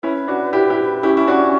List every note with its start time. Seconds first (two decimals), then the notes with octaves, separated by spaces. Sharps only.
0.03 C#4 E4 B4
0.28 D4 F#4
0.53 E4 G4
0.70 E4 G4
1.03 C#4 E4 G4
1.17 E4
1.27 D4 F#4